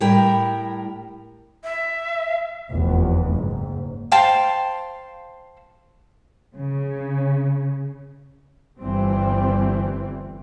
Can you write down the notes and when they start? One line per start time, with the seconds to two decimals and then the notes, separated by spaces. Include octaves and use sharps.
0.01 A2 G3 E4 A#4 G5
1.63 E5
2.69 F1 E2
3.32 F#1 G#2
4.12 C5 F5 G5 A5
6.54 C#3
8.79 G1 E3 G3 C4